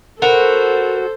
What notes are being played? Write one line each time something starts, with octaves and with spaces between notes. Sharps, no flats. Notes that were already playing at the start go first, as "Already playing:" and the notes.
F#4 A4 A#4 C5 B5